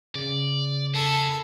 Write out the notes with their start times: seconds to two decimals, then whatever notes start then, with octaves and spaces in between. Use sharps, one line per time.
0.15 C#3 D5
0.94 E4 G#4 A4